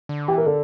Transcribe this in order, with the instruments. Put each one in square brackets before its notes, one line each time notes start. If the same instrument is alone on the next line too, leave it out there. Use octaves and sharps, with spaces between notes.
[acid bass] D3
[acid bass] E3 [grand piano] G4
[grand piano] A#4
[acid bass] D3 [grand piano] A4